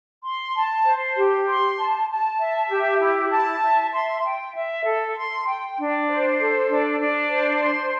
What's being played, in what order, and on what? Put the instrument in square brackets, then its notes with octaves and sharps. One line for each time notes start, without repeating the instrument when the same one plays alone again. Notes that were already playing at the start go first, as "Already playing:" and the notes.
[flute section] C6
A5
C5
G4
C6
A5
A5
E5
G4
E4
A5
E5
C6
G5
E5
A4
C6
G5
D4
C5
A4
D4
D4
C5
C6